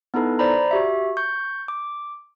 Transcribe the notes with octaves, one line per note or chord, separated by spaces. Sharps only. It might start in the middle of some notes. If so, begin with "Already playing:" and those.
B3 D#4 E4 A4 B4
C5 D5 A#5 B5
F#4 G4 E5
C#6 G6
D6